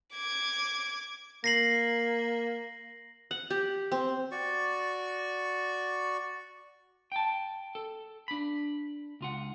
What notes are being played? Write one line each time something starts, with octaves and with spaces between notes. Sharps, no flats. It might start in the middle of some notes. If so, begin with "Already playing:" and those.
D6 G#6
A#3 A#6 C7 F#7
F#5
G4
C4
F#4 D5 C#6
G5 A5
A4
D4 B5
C#2 F4 F#5